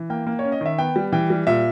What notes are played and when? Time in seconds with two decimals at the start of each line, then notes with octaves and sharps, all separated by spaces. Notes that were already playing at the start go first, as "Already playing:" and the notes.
Already playing: E3
0.10 A#3 G5
0.27 A#3
0.39 C#4 C#5
0.52 D#5
0.61 D#3 E5
0.78 B3 G5
0.96 G3
1.12 E3 G5
1.30 G3
1.47 A#2 E5